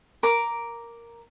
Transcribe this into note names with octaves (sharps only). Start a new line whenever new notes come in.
A#4 D6